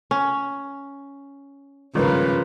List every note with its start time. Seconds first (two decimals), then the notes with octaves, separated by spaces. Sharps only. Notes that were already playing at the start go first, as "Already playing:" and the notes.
0.11 C#4
1.95 G#1 G2 C#3 F3 F4 A#4 B4